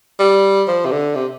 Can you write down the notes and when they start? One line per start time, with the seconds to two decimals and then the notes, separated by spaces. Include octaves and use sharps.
0.20 G3
0.68 F3
0.86 C3
0.92 D3
1.15 C3